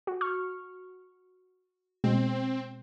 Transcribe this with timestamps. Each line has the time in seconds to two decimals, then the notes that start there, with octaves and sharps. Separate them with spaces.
0.07 F#4
0.21 C#6 F6
2.04 B2 G#3 C4